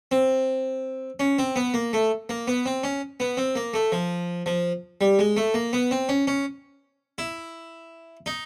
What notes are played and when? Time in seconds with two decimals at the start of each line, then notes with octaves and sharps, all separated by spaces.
0.11 C4
1.20 C#4
1.39 C4
1.56 B3
1.74 A#3
1.93 A3
2.29 A#3
2.48 B3
2.66 C4
2.84 C#4
3.20 B3
3.37 C4
3.56 A#3
3.74 A3
3.92 F3
4.46 F3
5.01 G3
5.19 G#3
5.37 A3
5.54 A#3
5.73 B3
5.91 C4
6.09 C#4
6.27 C#4
7.18 E4
8.26 D#4